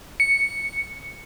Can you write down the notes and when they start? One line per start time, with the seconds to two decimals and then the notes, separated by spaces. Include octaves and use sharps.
0.20 C#7